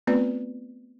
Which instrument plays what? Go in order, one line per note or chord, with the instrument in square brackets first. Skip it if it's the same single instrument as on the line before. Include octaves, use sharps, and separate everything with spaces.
[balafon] A3 B3 C4 F4 B4 D5